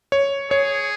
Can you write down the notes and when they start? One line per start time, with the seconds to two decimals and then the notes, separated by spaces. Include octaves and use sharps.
0.12 C#5
0.51 G#4 C#5